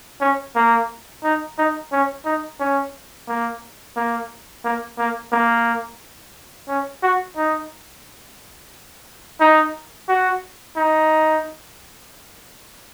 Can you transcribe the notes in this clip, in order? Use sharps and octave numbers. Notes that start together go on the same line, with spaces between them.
C#4
A#3
D#4
D#4
C#4
D#4
C#4
A#3
A#3
A#3
A#3
A#3
C#4
F#4
D#4
D#4
F#4
D#4